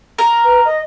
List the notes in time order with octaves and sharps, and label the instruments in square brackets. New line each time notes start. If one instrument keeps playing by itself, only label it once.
[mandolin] A#4
[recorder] B4
D#5